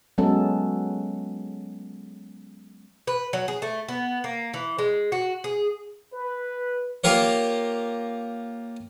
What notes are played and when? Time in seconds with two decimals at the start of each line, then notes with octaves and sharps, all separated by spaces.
0.18 F#3 G#3 B3 C#4 A4
3.07 B4
3.33 F#3
3.48 G#4
3.62 A3
3.89 B3
4.24 A#3
4.54 E3
4.78 G#3
5.12 F#4
5.44 G#4
6.14 B4
7.04 A#3 F4 G4 A#4 C#5